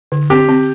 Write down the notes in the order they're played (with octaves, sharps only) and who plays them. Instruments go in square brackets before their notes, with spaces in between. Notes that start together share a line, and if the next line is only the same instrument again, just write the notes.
[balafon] D3
[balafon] C4 [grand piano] G4
[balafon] C4